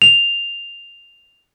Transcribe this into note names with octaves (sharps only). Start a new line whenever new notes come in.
F7